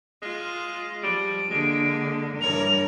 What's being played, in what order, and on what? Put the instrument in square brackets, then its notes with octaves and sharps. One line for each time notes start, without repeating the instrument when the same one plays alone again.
[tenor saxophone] G#3 [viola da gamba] F4
[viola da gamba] F3 [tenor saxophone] G3 [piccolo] D7
[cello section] D3 [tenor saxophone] G#3 [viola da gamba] A#3
[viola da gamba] G2 E3 C#5 [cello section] A#4 [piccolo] F7